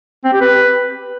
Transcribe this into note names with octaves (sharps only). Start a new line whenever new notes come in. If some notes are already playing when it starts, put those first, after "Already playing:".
C4
G4
B4